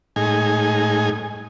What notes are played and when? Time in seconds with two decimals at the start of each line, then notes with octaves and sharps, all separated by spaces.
0.16 A2 G#3 D#4 G#5